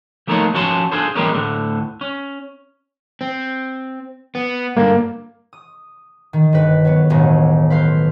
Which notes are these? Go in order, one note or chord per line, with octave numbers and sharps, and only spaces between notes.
F3 A3 A#3 D#4 F4 C#5
F3 C#4 F#4 C#5 A5 C6
D4 F4 G#4 A4 C5
E3 G3 G#3 A#3 B3 C#4
D2 A2 D3
C#4
C4
B3
G2 D3 A#3
D#6
D#3
G1 B4
F#3 B3
E1 A1 A2 D#3 A3
B4 C5 F5